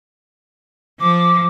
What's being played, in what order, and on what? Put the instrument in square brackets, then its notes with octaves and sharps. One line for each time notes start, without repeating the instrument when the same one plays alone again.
[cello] F3 [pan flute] D6